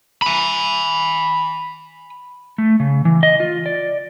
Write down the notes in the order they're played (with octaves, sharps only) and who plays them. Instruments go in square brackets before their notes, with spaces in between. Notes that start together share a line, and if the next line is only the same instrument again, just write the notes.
[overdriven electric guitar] G#5 B5
[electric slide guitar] A3
C#3
E3
D#5
F4
D5